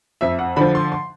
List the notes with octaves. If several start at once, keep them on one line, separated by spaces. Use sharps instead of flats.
F2 E5
F#5
D3 F3 B5
C6
C6